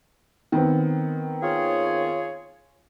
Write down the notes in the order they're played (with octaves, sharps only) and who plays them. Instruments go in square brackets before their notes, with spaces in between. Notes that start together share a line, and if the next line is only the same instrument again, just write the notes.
[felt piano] D#3 B3 C4
[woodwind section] F4 G#4 C#5